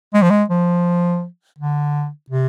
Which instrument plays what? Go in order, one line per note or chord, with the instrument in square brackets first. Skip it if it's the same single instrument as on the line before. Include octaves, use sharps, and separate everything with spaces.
[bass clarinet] G#3
F3
G#3
F3
D3
C3